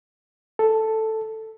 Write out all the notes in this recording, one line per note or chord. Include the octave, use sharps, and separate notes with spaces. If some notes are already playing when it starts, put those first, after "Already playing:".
A4